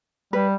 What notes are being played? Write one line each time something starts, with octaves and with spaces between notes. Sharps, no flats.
G3 B4